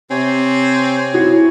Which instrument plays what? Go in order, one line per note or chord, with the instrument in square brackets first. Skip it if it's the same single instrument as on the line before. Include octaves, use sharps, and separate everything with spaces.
[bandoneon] C3 C#5 G#5 [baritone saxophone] C4
[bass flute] E4 [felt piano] F#4